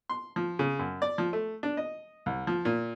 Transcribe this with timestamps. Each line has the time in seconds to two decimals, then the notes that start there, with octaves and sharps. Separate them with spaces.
0.09 C6
0.36 F3
0.59 C#3
0.79 F#2
1.02 D5
1.18 F3
1.33 A3
1.63 D4
1.77 D#5
2.26 C2
2.47 F3
2.65 A#2